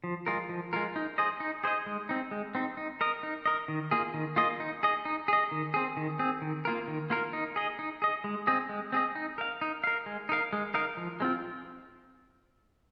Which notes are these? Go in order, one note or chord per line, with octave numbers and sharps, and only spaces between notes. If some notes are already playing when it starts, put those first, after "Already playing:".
F3
G#3 F4 A#4
F3
G#3 F4 A#4
D#4
G#4 C5 D#5
D#4
G#4 C5 D#5
G#3
C4 D#4
G#3
C4 D#4
D#4
A#4 D#5
D#4
A#4 D#5
D#3
A#3 F4 G#4 D#5
D#3
A#3 F4 G#4 D#5
D#4
G#4 D#5
D#4
G#4 D#5
D#3
C4 G#4
D#3
C4 G#4
D#3
A#3 F4 A#4
D#3
A#3 F4 A#4
D#4
G#4 D#5
D#4
G#4 D#5
G#3
C4 G#4 D#5
G#3
C4 G#4 D#5
D#4
A#4 F5
D#4
A#4 F5
G#3
D#4 A#4 F5
G#3
D#4 A#4 F5
F3
G#3 C4 F4